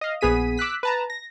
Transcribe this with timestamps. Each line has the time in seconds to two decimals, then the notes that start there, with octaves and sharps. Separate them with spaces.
0.01 D#5 F5
0.21 A#1 B3 G#4 B6 D#7
0.58 D6 E6 F#6 B6
0.83 B4 A5 A#5
1.10 A#6